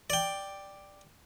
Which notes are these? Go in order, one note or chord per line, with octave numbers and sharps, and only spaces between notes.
D5 G5